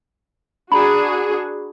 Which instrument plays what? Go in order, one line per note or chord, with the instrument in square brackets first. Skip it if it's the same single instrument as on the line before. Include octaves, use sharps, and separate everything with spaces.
[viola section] D4 F#4 G#4 [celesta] A#5 B5